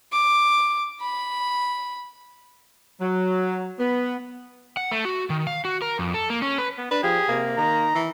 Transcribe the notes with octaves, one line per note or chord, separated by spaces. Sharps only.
D6
B5
F#3
B3
F#5
A3
F#4
D#3
F5
F#4
A#4
F2
A4
A#3
C#4
B4
B3
D4 B4
F3 G4 G#4
C3 A#3
D#3 A#5
E3